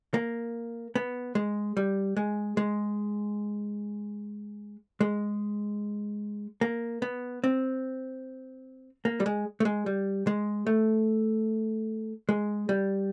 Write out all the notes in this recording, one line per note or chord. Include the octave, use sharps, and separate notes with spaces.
A#3
B3
G#3
G3
G#3
G#3
G#3
A#3
B3
C4
A#3
G3
G#3
A3
G#3
G3
G#3
A3
G#3
G3